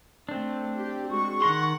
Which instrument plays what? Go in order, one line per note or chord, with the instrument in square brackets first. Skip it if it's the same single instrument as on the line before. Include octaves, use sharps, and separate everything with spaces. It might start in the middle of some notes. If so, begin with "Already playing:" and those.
[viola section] A3 [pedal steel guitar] C4 D4
[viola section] G4
[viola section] G#3 F#4 [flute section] C#6
[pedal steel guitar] D#3 A#5 C6 [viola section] F#5